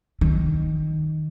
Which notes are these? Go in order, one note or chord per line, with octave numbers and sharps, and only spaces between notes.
D#3